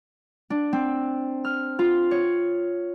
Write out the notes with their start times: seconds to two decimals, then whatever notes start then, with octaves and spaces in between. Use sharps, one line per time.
0.50 D4
0.73 C4
1.45 F6
1.79 F4
2.11 C#5